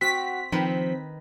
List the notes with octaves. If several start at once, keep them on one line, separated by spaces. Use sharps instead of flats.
C4 F#4 B6
D#3 F3 C4 B4